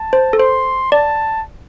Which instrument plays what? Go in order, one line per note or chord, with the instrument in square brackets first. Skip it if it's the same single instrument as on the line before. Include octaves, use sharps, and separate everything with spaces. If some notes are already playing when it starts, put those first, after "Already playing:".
Already playing: [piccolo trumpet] A5
[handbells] C5
A4
[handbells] C5 [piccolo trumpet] C6
[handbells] D5 [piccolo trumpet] A5